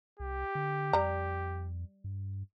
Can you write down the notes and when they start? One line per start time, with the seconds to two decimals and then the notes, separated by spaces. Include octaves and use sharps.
0.20 C2 G4
0.55 D3
0.93 F2 G3 A#5
2.04 G2